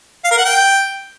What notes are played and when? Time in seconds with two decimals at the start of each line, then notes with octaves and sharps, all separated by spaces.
0.25 F5
0.31 A#4
0.38 F#5
0.45 G5